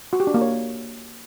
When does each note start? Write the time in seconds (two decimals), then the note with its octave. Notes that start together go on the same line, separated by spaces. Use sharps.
0.13 F#4
0.20 G4
0.27 D4
0.34 A#3
0.41 C#5